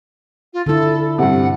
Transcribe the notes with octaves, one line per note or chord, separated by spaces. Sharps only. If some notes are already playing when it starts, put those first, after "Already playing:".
F4
D3 E4 A4
G2 C3 F#5